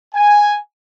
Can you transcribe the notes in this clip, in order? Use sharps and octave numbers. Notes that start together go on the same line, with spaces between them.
G#5